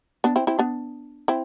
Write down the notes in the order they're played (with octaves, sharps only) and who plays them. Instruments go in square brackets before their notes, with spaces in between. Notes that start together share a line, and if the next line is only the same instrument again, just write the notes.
[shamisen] B3 D4
C4 E4
C4 E4
B3 D4
C4 E4